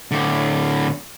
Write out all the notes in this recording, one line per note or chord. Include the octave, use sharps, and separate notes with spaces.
A2 D3